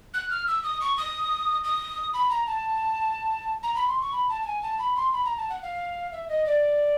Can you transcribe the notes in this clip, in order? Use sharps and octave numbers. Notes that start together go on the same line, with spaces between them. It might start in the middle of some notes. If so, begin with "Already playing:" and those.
F#6
F6
E6
D#6
C#6
D#6
D#6
B5
A#5
A5
A#5
B5
C6
C#6
B5
A5
A5
G#5
A5
B5
C6
B5
A#5
A5
F#5
F5
E5
D#5
D5